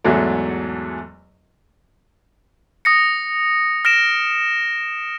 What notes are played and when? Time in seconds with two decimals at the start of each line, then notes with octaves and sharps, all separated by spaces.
0.04 E2 G#2 F#3 A3
2.85 D#6 A#6 C#7
3.85 F6 A#6 D7 E7